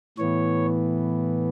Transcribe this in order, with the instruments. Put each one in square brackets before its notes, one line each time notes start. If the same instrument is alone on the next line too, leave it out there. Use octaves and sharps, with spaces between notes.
[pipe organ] A2 E3 B3 C#5